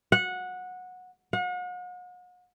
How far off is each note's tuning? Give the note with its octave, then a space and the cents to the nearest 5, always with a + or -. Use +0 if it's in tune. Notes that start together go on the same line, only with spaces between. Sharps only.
F#5 -15
F#5 -40